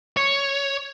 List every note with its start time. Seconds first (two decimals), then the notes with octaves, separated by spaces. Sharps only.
0.17 C#5